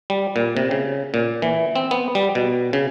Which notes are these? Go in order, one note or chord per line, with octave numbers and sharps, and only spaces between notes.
G3
A#2
C3
C#3
A#2
E3
C4
B3
G3
B2
C#3